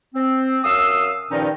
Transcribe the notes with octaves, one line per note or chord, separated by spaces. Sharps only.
C4
F#2 F5 D#6 E6
G2 A#2 D#3 F3 C#4 D#4